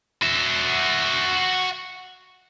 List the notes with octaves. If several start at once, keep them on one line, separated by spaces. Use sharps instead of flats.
F#4 E5